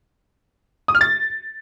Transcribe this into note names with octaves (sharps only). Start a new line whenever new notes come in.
D#6
F6
A6